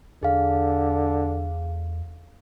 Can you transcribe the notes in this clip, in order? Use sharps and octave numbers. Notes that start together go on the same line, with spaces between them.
E2 D3 G#4 F5